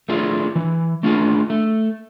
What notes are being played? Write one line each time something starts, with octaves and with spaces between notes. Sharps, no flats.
A3 D4 F4 G#4
E3
A3 D4 F4 G#4
A3